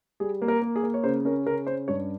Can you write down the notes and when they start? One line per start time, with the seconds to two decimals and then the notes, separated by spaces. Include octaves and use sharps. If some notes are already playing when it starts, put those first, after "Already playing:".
0.20 G3 G#4
0.42 A#3
0.48 A#4
0.62 A#3
0.76 G#4
0.83 A#3
0.94 C#5
1.04 C#3 C5
1.25 C#4 A#4
1.46 C#3 A#4
1.67 C#4 C5
1.88 G2 C#5